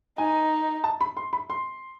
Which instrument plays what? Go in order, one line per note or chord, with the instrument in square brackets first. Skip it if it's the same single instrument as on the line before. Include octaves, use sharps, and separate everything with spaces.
[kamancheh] D#4 [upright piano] G#5
[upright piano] A5
B5
C6
B5
C6